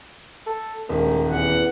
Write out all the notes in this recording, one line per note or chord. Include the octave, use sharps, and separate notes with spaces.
A4
D#1 D2 D#3 G#3 A#4
E2 E3 F#5